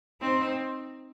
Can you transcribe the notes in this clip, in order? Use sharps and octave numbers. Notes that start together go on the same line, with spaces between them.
C4 D#4